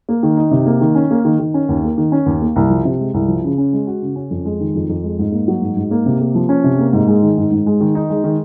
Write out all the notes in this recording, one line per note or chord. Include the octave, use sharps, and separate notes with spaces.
A#3
D#3
D#4
C3
A#3
D#3
C#4
A#3
D#3
D#3
C#4
D#2
A#3
D#3
C#4
D#2
A#3
C2
F3
C3
G#3
C2
F3
C#3
C#4
G#3
F#4
C#3
C#4
F2
G#3
D#3
F2
F2
G#3
G#2
A#3
F#3
G#2
G#2
A#3
C3
A#3
F3
C#4
C3
A#3
G#2
G#3
D#3
G#2
G#2
G#3
D#3
D#4
G#3
D#3